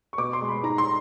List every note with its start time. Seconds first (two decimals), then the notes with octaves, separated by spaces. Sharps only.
0.13 C#6
0.18 B2 D6
0.33 C6
0.41 G#3
0.48 B5
0.63 G#2 A#5
0.78 C6